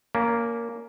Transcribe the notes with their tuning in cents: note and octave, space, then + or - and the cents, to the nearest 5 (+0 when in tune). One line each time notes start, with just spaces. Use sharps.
A#3 +0 C#4 +30